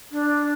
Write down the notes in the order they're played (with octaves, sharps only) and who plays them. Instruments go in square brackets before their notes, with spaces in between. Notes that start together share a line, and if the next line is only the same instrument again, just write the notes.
[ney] D4